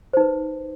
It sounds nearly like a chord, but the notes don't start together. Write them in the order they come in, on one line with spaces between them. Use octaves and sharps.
C5 D#4 B4